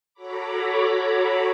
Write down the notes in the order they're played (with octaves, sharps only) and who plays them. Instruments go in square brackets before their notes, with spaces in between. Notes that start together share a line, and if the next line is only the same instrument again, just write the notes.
[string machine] F#4 A4 C#5 A#5 B5 D6